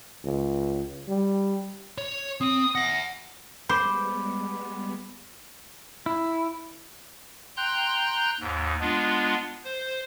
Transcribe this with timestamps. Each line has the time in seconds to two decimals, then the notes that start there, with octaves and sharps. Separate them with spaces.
0.25 C#2
1.08 G3
1.98 C#5
2.41 C4 D#6
2.75 E5 F#5 A#6
3.69 G3 G#3 B3 C5 B5 D6
6.06 E4
7.57 G5 A#5 C6 F#6 G6
8.40 D#2 G#2
8.81 G#3 B3 D4 F4
9.64 C5